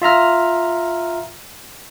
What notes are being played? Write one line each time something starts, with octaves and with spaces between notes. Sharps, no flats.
F4 E5 A#5 F6